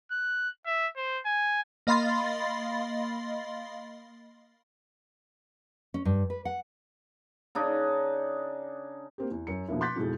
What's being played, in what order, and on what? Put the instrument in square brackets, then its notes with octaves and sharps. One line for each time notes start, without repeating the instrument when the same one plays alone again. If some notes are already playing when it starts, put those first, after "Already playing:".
[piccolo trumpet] F#6
E5
C5
G#5
[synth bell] A#3 D#5 F5 B5 C6 A6
[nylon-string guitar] C#4
G2
B4
F#5
[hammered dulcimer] C#3 D4 D#4
[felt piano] A#3 C4 G4
E2
F#2 C#7
B2 D3 F3 A#3 E4
C6 D6 F#6 G6 A6 B6
F2 G#2 B2 E3 G#3